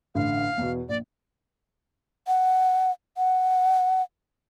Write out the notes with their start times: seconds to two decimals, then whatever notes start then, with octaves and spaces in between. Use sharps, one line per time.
0.15 A1 D3 F5
0.58 E2 B2
0.89 A#1 D5
2.27 F#5
3.17 F#5